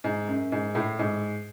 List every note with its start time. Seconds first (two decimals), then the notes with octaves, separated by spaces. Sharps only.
0.04 G#2
0.28 F#2
0.52 G#2
0.75 A2
0.99 G#2